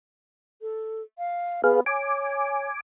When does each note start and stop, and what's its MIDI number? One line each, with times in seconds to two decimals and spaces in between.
0.62 1.02 69
1.18 1.64 77
1.64 1.85 59
1.64 1.80 68
1.64 1.80 71
1.64 1.80 77
1.86 2.67 73
1.86 2.80 80
1.86 2.80 86